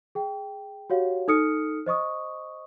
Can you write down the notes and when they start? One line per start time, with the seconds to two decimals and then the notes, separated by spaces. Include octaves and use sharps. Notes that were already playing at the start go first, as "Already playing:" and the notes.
0.15 G#4 G5
0.90 F#4 G4 C#5 F5 F#5
1.28 D#4 A4 D#6 F6 C#7
1.86 C5 D#5 C#6 D#6